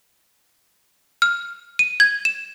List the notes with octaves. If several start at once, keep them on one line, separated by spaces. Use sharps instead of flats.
F6
D#7
G#6
E7